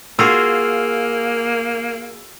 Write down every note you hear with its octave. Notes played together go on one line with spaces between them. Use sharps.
A#3 F4 F#4 G#4 E6